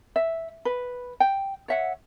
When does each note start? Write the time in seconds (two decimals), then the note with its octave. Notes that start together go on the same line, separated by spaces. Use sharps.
0.16 E5
0.65 B4
1.20 G5
1.68 C#5 E5 F#5